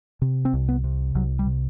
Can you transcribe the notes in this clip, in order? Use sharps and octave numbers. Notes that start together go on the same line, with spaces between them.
C3
C4
C2
B3
C3
C2 F#3
G3
C3